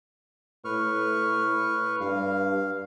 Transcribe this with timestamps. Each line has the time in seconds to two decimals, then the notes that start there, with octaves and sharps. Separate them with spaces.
0.65 A2 B4 C#6 F6
2.01 G2 F5